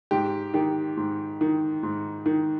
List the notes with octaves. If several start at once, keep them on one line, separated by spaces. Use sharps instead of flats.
G#2 G4
D#3 G4
G#2
D#3
G#2
D#3